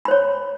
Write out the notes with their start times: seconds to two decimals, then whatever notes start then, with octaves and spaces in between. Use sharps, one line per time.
0.05 B5
0.08 C5
0.11 C#5